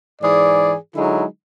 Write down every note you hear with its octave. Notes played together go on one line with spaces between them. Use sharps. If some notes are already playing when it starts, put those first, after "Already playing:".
G#2 E3 G#4 D5
D3 F#3 G#3 D#4 E4